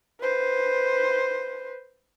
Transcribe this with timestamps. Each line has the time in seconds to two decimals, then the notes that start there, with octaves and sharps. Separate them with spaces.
0.21 B4 C5